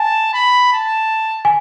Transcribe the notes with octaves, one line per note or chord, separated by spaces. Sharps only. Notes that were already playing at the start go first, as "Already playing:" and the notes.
Already playing: G#5 A5
B5
A5
G#5